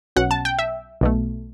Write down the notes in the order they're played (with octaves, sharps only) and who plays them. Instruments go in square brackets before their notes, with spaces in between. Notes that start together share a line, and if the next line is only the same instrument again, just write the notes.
[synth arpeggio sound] B1 B2 F#3 C#4 F#5
A5
G5
E5
B1 B2 A3